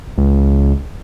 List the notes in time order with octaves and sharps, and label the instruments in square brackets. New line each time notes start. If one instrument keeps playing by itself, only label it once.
[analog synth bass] C#2